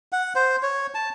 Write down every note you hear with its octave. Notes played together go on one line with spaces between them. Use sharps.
F#5
C5
C#5
A5